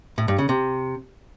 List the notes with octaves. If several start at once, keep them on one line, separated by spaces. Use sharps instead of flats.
A2
G2
C#3
C3